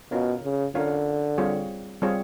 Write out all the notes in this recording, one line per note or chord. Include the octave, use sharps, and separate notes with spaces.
B2 C#4 F4 A#4 C#5 F5
C#3
D3 C#4 F4 A#4 C#5 F5
G3 C4 F4 G#4 C#5
G3 C4 F4 G#4 C#5